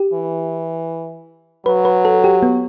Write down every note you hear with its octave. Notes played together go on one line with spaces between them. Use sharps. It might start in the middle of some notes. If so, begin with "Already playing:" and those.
Already playing: G4
E3
F#3 B4
B4
A4
G4
B3